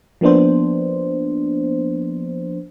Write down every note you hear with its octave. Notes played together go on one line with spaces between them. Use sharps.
F3 A#3 B3 D4 C5